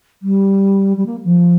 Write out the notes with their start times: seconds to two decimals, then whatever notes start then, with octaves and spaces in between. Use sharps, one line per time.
0.22 G3
0.97 G3
1.06 A#3
1.24 F3